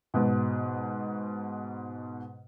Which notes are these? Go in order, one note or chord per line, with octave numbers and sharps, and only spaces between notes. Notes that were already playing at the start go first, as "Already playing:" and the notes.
G#2 B2